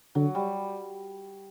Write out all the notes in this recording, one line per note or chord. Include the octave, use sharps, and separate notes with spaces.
D3 F#3
G3